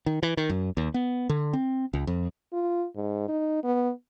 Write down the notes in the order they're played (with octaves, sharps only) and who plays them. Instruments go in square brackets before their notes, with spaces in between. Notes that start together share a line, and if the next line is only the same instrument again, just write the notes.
[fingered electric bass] D#3
E3
D#3
F#2
D#2
B3
D3
C4
C#2
F2
[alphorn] F4
G#2
D#4
B3